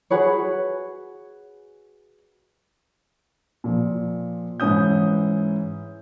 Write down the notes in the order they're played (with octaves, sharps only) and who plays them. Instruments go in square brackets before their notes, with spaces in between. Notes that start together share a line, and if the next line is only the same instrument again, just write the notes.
[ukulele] F#4 G#4 B4 C#5
[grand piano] A#2 F3
G#2 E3 C#4 D#6 G6